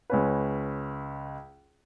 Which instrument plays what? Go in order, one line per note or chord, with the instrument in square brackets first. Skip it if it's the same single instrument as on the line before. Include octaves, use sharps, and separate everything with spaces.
[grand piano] C#2 C#4 B4